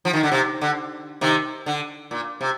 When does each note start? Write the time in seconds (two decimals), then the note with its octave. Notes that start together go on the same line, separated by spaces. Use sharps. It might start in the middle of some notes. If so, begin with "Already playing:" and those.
0.05 F3
0.13 D#3
0.23 D3
0.32 C3
0.61 D3
1.21 C3 D#3
1.66 D3
2.11 A#2
2.41 C3